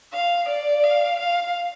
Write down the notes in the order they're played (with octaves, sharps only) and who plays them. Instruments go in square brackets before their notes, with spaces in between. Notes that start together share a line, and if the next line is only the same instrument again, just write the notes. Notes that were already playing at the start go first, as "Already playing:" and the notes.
[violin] F5
D5
F5
F5